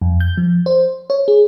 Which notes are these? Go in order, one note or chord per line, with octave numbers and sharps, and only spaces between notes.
F2
G6
F3
C5
C#5
G#4